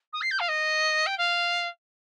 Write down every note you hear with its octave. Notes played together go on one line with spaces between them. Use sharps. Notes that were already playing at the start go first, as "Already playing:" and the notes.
D#6
C7
G6
F5
D#5
G5
F5